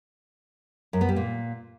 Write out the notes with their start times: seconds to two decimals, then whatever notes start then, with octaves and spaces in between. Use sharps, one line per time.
0.93 F#2
1.01 B3
1.09 G3
1.16 A#2